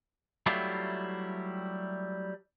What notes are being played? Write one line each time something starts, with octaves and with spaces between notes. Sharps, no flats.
F#3 G3 A3 E4 F4 G4